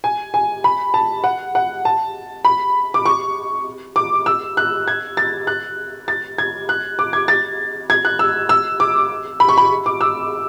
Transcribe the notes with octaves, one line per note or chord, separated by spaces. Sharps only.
G#5
G#5
B5
A5
F#5
F#5
A5
B5
D6
C#6
D6
E6
F#6
G#6
A6
F#6
A6
G#6
F#6
D6
G#6
A6
G#6
F#6
E6
E6
D6
B5
C#6
B5
D6
E6